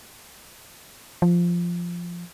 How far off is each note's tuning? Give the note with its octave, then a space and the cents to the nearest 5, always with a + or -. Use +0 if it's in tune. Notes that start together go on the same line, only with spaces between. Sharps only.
F3 -5